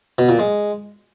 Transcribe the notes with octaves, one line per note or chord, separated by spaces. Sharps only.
B2
A#2
G#3